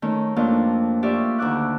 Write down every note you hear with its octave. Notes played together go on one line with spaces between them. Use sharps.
D#3 A3 C#4
F2 A3 A#3 D4 F4 F6
F4 G4 D5 E5 C#6 F6
D2 D#3 E5 D6 F#6